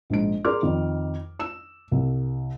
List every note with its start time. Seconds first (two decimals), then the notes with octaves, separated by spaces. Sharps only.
0.10 A#1 G#2 D7
0.45 G#4 A#4 D5 C6 D6 F6
0.62 F2 D#3
1.39 E6 E7
1.91 C2